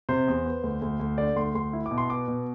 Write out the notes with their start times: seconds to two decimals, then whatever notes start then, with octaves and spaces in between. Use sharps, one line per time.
0.09 C3 C5
0.27 E2
0.46 B3
0.64 D2
0.82 D2
1.00 D2
1.18 D3 D5
1.36 D2 C6
1.55 D2 C6
1.73 E4
1.86 D6
1.91 B2
1.98 C6
2.09 B3 D6
2.28 B2